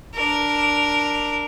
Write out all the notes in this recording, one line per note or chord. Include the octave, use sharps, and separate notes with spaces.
D4 A#4